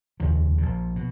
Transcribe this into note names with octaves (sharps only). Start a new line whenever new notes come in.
F1 D#2 C#3 F3
A#1 A#2
B2